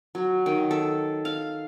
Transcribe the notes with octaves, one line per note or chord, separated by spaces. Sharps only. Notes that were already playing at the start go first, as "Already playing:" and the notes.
F#3
D#3
A4
F5